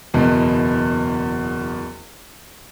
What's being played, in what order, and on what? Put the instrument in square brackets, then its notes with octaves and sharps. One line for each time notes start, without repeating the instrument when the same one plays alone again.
[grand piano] F#1 E2 B2